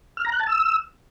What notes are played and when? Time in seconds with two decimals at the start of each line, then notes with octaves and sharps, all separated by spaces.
0.17 F6
0.25 A#5
0.32 F#6
0.40 A5
0.47 E6